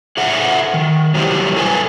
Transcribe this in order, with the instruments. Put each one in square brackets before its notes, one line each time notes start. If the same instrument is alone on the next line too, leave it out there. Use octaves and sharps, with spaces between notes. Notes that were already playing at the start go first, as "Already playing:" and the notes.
[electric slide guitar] G#4 A4 E5 F#5
D#3
F#3 G3 E4 G4 C5
G#4 A4 B4 G#5